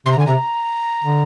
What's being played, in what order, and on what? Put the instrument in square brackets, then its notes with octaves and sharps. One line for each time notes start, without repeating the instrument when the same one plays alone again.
[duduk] C3 [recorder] C6
[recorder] A#5
[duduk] D3 [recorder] G#5
[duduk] C3 [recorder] A#5
[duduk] D3